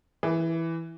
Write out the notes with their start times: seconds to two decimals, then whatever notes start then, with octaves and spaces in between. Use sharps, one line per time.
0.23 E3